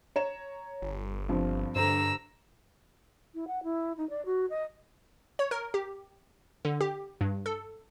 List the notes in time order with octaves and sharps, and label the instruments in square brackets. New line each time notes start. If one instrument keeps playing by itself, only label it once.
[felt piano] C#5 A#5 E7
[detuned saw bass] G1
[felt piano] G2 C3 F3
[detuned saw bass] G2 [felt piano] D3 C5 [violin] A#5 E6
[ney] E4
F#5
E4
D#4
D5
F#4
D#5
[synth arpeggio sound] C#5
A#4
G4
D3
G4
G2
A4